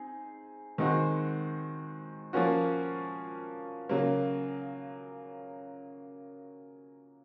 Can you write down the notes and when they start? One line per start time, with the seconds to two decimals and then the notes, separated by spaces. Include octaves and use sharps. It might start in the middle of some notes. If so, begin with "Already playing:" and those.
Already playing: C4 D#4 G#4
0.78 D#3 G#3 C4 D#4 F#4
2.33 F3 A#3 C#4 F#4
3.89 C#3 F#3 A#3